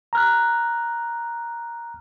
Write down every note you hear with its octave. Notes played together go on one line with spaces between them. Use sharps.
A#5 F6 F#6